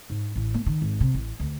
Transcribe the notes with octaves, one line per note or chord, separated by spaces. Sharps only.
G#2
A1
A#3
D#3
G#1
C3
A1
D2